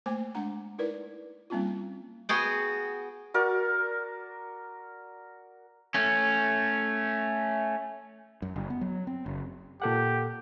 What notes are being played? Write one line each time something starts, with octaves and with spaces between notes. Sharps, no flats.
A3 A#3 C5 G#5 D6
G#3 D4 F#5 A#5
D#4 E4 A#4 B4 D5
G3 A#3 C4 C#4 D#4 F4
B3 F#4 G#4 G5
F#4 A#4 D5
A3 C#4
F#2
F#1
B3
F#3
C4
F#1
A#2 G4 A4 F#5